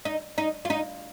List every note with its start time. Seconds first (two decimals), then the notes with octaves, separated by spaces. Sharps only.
0.05 D#4
0.38 D#4
0.65 F4
0.70 D#4